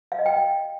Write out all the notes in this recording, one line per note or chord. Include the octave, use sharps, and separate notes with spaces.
F5
D#5
G5